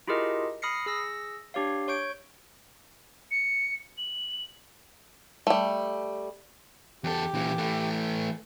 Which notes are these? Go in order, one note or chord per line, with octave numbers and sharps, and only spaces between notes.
E4 F4 G4 G#4 A#4 D#5
B5 D#6 F6 A#6 C7 C#7
G#4 E6 A#6
D4 G4 C#5 F5
C#5 C#6 G6 D7
C#7
F#7
G3 A3
E2 G4 A4
A#2 E3
E3 A3